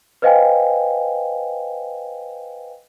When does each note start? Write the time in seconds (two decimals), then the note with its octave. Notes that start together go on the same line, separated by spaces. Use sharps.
0.22 B4 C5 D#5 F5 G5 G#5